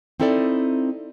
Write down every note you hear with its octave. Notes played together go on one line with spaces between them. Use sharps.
C4 D#4 E4 A4 B4 D5